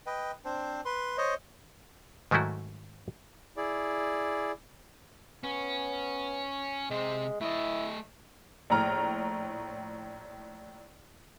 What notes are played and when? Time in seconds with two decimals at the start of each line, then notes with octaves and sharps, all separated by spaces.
0.06 B4 D#5 G5
0.45 C4 D4 C5
0.85 B4 C6
1.18 C5 C#5 D#5
2.31 G#2 D#3 F#3 A3 E4 F#4
3.57 E4 G#4 D5
5.44 B3 C#4
6.90 C3 G#3 C5
7.41 A3 E4 D#5
8.70 A#1 A2 A#5 F6